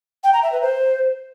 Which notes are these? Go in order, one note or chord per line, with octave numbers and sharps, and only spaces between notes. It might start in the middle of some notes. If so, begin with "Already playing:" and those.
G5
A#5
E5
B4
C5